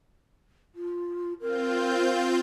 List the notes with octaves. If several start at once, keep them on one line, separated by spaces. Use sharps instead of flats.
F4
C4 F4 A#4 G6